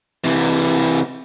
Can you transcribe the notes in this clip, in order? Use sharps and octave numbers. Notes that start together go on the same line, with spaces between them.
C3 E3